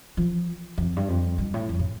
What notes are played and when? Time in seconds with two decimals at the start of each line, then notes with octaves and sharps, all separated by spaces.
0.17 F3
0.78 F2
0.96 G2
1.08 F2
1.38 G2
1.54 A2
1.69 F2
1.79 A2